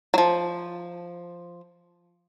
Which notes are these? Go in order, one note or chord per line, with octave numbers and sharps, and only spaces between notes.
F3 F#3